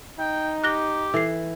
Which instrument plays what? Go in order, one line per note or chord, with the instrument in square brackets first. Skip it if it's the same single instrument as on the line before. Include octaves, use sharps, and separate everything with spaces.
[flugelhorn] D#4 [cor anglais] G5
[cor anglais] G4 [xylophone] F#6 A#6 G7
[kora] E3 [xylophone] A4 C7